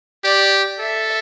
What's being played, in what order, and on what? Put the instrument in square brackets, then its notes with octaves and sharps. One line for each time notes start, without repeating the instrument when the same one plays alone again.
[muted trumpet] G4 [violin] D5
[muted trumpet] A4 [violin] E5